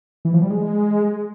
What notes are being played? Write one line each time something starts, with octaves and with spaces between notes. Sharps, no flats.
E3
F3
G3
G#3